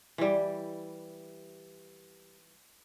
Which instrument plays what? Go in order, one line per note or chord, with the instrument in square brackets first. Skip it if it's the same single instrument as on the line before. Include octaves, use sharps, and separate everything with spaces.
[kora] E3 G3